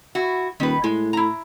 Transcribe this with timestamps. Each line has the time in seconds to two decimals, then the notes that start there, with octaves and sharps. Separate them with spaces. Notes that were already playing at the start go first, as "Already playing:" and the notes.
0.15 E4 F#4
0.60 D#1 D#3 B4
0.84 A2 G#3
1.13 E4 A#5